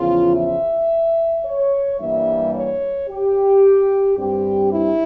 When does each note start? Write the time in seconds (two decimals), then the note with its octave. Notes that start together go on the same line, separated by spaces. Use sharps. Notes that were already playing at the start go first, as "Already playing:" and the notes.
Already playing: E2 C#3 F3 F4
0.36 E5
1.44 C#5
1.99 G2 E3 G3 A#3 E5
2.54 C#5
3.09 G4
4.17 G2 G3 C4 G4
4.73 E4